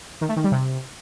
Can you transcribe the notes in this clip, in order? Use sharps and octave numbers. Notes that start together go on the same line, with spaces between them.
D#3
A3
D#3
G3
C3